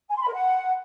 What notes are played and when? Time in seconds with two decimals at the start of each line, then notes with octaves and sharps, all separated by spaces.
0.09 G#5
0.15 C6
0.21 B5
0.27 A#4
0.33 F#5